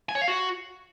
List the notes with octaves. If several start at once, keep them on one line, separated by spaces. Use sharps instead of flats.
G#5
C#5
F5
F#4